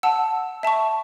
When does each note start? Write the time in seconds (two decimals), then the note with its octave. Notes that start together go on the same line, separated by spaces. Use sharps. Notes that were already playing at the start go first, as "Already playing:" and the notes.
0.03 F#5 A5 E6
0.63 E5 A5 C#6